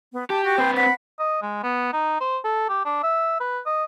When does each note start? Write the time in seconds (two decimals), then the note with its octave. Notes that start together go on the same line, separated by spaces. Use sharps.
0.13 B3
0.30 G4 A5
0.45 F#4 G5
0.58 C4 B4 C5
0.77 F#5 B5
1.19 D#5
1.42 G#3
1.63 B3
1.93 D#4
2.20 C5
2.44 A4
2.69 G4
2.85 D4
3.03 E5
3.40 B4
3.65 D#5